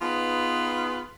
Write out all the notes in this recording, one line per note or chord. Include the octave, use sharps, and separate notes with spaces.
B3 D#4 F4 G#4 B4